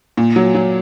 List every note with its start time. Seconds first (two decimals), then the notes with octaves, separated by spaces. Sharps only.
0.17 A#2
0.36 F#3
0.55 F#3